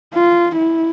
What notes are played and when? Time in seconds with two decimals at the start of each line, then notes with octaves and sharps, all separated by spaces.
0.14 F4
0.58 E4